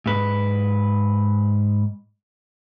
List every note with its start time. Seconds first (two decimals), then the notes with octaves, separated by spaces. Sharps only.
0.06 G#2 B4